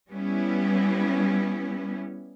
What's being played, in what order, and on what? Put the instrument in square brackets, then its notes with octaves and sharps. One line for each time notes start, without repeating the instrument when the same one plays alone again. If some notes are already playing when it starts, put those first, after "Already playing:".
[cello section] G3 B3 C#4 E4